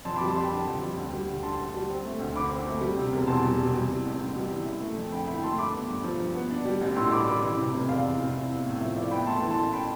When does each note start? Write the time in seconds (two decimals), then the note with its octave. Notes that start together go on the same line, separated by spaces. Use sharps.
0.05 F2 A5 C6
0.16 G3 B5 D6
0.28 A5 C6
0.35 F2 G5 B5
0.51 D3
0.66 F2
0.81 G3
0.97 D2
1.13 G3
1.28 D2
1.43 D3 A5 C6
1.59 D2
1.74 G3
1.89 C4
2.05 A3
2.20 D2
2.35 D3 B5 D6
2.51 C4
2.66 A3
2.81 G3
2.97 C3
3.13 E1
3.27 E2 A5 C6
3.43 G3
3.58 C3
3.74 G3
3.90 E3
4.05 A1
4.20 G2
4.36 G3
4.50 E3
4.66 E4
4.81 A3
4.97 F2
5.12 D3 G5 B5
5.27 E4 G5 B5
5.43 A3 A5 C6
5.58 G2 B5 D6
5.73 B3
5.89 G2
6.04 F3
6.20 G2
6.35 B3
6.51 D4
6.65 G3
6.81 A1
6.96 A2 C6 E6
7.11 D4 B5 D6
7.27 G3 B5 D6
7.43 E3
7.57 C3
7.74 F1
7.89 E2 D5 F5
8.04 E3
8.19 C3
8.35 E4
8.51 B3
8.66 A2
8.81 F3 E5
8.96 E4 D5 F5
9.11 B3 G5 B5
9.27 A3 A5 C6
9.42 E3
9.51 A5 C6
9.58 A1
9.73 G5 B5